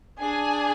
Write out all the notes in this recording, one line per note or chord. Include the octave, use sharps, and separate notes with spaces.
D4 G#4 G#5